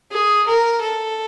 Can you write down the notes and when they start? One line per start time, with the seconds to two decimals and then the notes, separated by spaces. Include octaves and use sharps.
0.12 G#4
0.47 A#4
0.81 A4